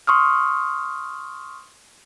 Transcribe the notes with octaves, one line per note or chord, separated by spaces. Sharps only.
C6 C#6 D#6 F6